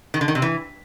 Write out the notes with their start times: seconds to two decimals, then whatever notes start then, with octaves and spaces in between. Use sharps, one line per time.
0.14 D#3
0.21 D3
0.28 D#3
0.35 C3
0.42 E3